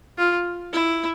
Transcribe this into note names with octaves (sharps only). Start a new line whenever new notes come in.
F4
E4